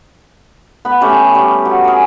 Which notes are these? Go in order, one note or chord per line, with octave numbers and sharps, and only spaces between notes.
B3 B5
A3 C#4 G4
G3
F#3
G#4 A#4